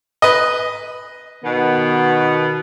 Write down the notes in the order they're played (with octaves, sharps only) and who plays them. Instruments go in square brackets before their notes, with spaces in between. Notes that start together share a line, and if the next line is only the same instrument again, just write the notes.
[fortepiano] B4 D#5
[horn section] B2 D#3 B3